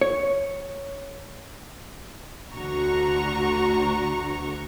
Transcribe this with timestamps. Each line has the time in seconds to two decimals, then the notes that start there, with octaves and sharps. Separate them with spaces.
0.01 C#5
2.54 D2 D3 F#4 A#5 C#6